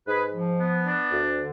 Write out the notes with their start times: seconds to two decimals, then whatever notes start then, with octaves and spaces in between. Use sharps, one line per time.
0.07 G#2 G#4 B4
0.33 F3
0.60 B3
0.85 D4
1.12 D2
1.37 D3